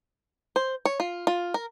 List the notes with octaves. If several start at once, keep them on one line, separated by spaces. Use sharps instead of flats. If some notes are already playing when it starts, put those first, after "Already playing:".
C5
C#5
F4
F4
A#4